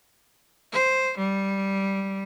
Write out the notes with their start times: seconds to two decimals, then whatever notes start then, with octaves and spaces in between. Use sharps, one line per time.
0.73 C5
1.18 G3